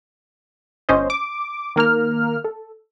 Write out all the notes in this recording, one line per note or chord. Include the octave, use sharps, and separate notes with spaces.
G1 C#4 C5 D#5
D6
D#3 A#3 A#4 F6
A4